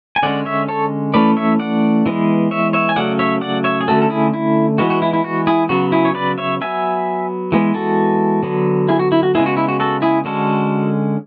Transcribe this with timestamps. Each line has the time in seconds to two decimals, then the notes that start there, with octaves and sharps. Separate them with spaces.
0.16 G#5
0.23 D3 G#3 C#4 D5 F#5
0.45 C#5 E5
0.68 A4 C#5
1.14 E3 A3 C#4 B4 D5
1.37 C#5 E5
1.59 D5 F#5
2.06 E3 G#3 B3
2.51 C#5 E5
2.73 C#5 E5
2.89 G#5
2.96 C#3 F#3 A3 C#4 D5 F#5
3.19 C#5 E5
3.41 D5 F#5
3.64 C#5 E5
3.81 G#4
3.88 D3 A3 C#4 F#4 A4
4.02 A4
4.10 E4 G#4
4.34 E4
4.78 E3 G#3 B3 F#4
4.90 F#4
5.02 E4
5.13 E4
5.24 F#4
5.47 E4 G#4
5.69 C#3 F#3 B3 F#4
5.92 E4 G#4
6.05 C#5
6.15 B4 D5
6.38 C#5 E5
6.61 F#3 B3 E5 G#5
7.52 E3 G#3 B3
7.74 F#4 A4
8.43 D3 F#3 B3
8.88 E4 G#4
8.99 F#4
9.12 E4
9.23 F#4
9.35 C#3 G#3 B3 E4 G#4
9.46 F#4
9.57 E4
9.68 F#4
9.80 F#4 A4
10.02 E4 G#4
10.25 D3 G#3 C#4 F#4 A4